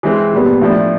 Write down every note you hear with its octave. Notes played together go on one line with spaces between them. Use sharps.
E3 G#3 C4
A#2 G3 B3
A2 F3 A3 D4